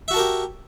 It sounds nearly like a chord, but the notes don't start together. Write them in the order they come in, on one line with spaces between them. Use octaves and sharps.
E5 F#4 A5 A#4 G4